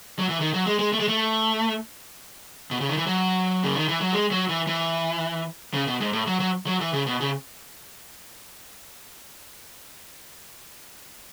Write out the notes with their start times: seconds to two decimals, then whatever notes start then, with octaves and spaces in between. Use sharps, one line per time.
0.19 F#3
0.29 E3
0.40 D#3
0.54 F#3
0.66 G#3
0.79 G#3
0.93 A3
1.00 G#3
1.08 A3
2.71 B2
2.80 C#3
2.89 D#3
2.97 E3
3.07 F#3
3.63 C#3
3.76 D#3
3.89 E3
4.01 F#3
4.13 G#3
4.31 F#3
4.49 E3
4.67 E3
5.74 C#3
5.87 B2
6.00 G#2
6.13 A2
6.27 F#3
6.40 F#3
6.66 F#3
6.81 E3
6.93 C#3
7.07 B2
7.21 C#3